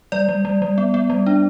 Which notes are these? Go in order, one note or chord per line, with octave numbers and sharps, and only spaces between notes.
G3 D5
G3
G3
G3
B3
B3
G3
D4